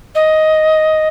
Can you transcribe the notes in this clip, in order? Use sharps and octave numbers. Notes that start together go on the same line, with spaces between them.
D#5